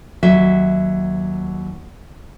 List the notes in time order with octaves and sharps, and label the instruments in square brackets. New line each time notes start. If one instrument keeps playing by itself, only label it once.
[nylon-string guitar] D#2 F#3 E5